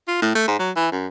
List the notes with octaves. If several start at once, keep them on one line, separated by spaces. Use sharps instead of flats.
F4
A2
A3
G#2
F#3
E3
F#2